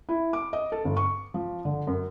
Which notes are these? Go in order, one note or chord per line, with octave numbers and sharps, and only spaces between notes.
E4
D6
D#5
A4
G1
C#6
F3
D3
F#2